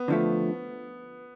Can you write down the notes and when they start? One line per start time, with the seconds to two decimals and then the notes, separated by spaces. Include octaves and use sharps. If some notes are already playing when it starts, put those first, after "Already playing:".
Already playing: B3
0.08 D3 F3 A3